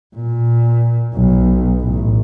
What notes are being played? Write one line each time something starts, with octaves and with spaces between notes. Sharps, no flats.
A#2
B1
A1